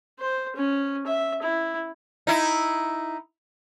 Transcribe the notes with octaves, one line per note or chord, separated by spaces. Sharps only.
C5
C#4
E5
E4
D#4 E4